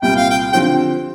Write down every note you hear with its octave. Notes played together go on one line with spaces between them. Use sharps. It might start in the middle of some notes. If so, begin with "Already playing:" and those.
C2 A#2 G3 G5
F5
G5
D3 F3 C4 G4 G5